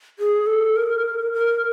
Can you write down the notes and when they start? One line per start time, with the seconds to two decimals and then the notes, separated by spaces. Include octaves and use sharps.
0.19 G#4
0.47 A4
0.76 A#4
1.33 A#4